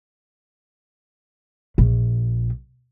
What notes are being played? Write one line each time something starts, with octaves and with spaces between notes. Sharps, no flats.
A#1